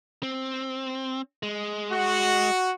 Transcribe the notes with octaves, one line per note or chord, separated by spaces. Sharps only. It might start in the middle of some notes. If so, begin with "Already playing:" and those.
C4
G#3
F#4